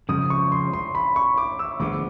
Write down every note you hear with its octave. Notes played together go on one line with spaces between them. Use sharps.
F2 C#3 F3 G#3 D#6
C#6
C6
C6
B5
C#6
D6
E6
D2 D3 F3 G#3 B3 D6